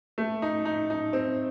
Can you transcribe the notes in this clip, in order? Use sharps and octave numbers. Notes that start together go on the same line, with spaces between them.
A3
D#4
D#4
D#4
C4